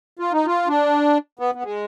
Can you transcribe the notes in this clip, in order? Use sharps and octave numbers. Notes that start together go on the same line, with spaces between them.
F4
D#4
F4
D4
B3
B3
G#3